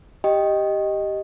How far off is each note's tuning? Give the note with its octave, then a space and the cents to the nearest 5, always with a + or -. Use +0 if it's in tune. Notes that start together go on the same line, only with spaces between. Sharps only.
G4 +0 D#5 +0 G5 +0